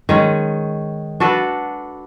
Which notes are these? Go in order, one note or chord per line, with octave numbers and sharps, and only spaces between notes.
D#3 G#3 C#4
D4 F#4 A4 B4